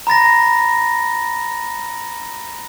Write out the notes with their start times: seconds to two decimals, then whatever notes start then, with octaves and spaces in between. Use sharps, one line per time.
0.07 A#5 B5 A6 A#6